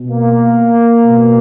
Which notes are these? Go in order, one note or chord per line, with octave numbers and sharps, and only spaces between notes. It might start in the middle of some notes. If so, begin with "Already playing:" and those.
Already playing: B2
A#3
B2